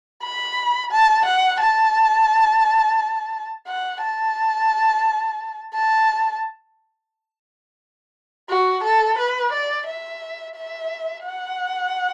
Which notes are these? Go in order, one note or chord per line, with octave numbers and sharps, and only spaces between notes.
B5
A5
F#5
A5
F#5
A5
A5
F#4
A4
B4
D5
E5
E5
F#5